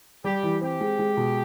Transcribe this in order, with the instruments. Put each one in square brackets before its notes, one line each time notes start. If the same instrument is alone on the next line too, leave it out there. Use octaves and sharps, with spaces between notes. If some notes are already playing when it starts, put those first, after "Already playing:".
[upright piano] G3 [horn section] G4
[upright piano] E3
[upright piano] C4 [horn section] G4
[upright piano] G#3
G#3
B2